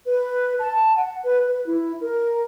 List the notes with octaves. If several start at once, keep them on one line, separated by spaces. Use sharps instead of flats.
B4
A5
F#5
B4
B4
E4
A#4